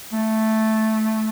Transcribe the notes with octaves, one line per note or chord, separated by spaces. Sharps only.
A3